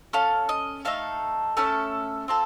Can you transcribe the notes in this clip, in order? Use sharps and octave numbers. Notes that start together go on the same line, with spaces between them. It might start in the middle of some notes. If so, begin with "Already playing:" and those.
C#4 A4 F5
D#5
A3 D#4 A4 F5
A3 C#4 A4 A5
C4 F4 A4